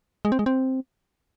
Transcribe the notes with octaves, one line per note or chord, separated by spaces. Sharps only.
G#3
C4
G#3
C4